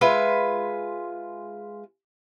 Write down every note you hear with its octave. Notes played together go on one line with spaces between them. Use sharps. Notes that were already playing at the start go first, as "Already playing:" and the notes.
G#3 F4 B4 E5